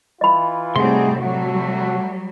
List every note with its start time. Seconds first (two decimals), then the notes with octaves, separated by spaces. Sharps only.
0.21 E3 F4 D#5 B5
0.76 A2 C3 G3 C4 D#4 F#4 G#4 C6
1.18 F#3 G3 A3 F#4